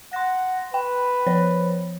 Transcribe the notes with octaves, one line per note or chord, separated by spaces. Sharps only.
F#5 C6 A#6
B4 G5
F3 C5 C#5